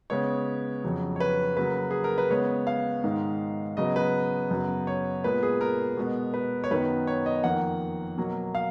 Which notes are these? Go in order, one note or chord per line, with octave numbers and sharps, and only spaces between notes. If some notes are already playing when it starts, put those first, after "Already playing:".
C#3 G#3 B3 C#5
F2 C#3 F#3
C#5
B4
C#3 F#3 A#3 B4
G#4
A#4
B4
C#3 G#3 B3 C#5
F5
G#2 D#3 G#3
C#3 F#3 B3 D#5
B4
F#2 C#3 F#3 B3
C#5
A#2 G#3 B3 B4
G#4
A#4
B2 G#3 B3
B4
C#5
F#2 D#3 F#3 B3 B4
C#5
D#5
F2 D#3 A#3 F#5
B2 F#3 A#3
F5